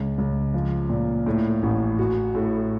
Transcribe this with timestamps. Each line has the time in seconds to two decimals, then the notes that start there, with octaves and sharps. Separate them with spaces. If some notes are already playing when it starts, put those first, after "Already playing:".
Already playing: C#2
0.18 C#2
0.54 F3
0.89 A#2
1.26 A2
1.63 A1
1.99 F#4
2.35 A2